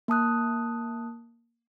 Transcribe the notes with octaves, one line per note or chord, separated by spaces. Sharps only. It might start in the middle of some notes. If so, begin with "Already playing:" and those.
A#3 A5 D#6 F#6